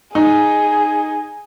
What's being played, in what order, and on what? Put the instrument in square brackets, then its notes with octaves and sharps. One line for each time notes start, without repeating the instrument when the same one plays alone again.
[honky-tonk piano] D#4 [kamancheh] G#4